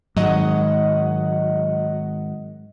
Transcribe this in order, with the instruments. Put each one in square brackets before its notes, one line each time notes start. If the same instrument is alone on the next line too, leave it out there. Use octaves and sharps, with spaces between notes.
[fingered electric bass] G#2 D#3 G#3 [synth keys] F#3 D#5 F#5